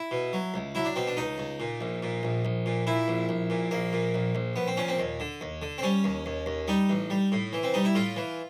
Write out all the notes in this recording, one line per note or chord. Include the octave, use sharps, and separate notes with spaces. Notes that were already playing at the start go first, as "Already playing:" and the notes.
Already playing: E4
B2
F#3
C#2
F#3 E4
D4
B2 C4
D4
C#2 D#4
C#2
A#2
A#1
A#2
A#1
A#1
A#2
A#2 E4
A#1
A#1
A#2
A#1 A#3
A#2
A#1
A#1
A#1 B3
C4
A#2 C#4
C4
D#2
D3
D#2
D3
C4
G3 C#4
D#2
D#2
D#2
G3 D#4
A1
G3
A2
E3
C4
G3 D#4
E4
A2 F4
E3